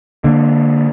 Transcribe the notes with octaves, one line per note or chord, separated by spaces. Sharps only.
D3 A#3